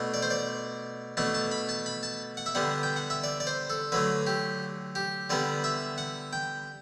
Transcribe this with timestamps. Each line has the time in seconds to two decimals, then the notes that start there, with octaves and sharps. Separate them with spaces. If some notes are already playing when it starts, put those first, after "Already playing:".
Already playing: B2 A3 D4
0.14 D5
0.22 C5
0.30 D5
1.17 B2 A3 D4 A5
1.34 A5
1.51 B5
1.69 A5
1.86 B5
2.03 A5
2.37 F#5
2.46 E5
2.55 D3 G3 B3 D4 F#5
2.83 G5
2.96 F#5
3.10 E5
3.24 D5
3.40 D5
3.47 C5
3.70 A4
3.92 D3 F#3 A3 B4
4.27 G4
4.95 G4
5.30 D3 G3 B3 D5
5.64 E5
5.98 F#5
6.33 G5